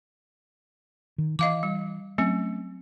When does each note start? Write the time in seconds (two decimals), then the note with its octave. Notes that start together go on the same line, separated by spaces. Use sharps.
1.18 D#3
1.39 E3 D#5 F5 D6
1.63 G3
2.18 F#3 A3 C4 C#4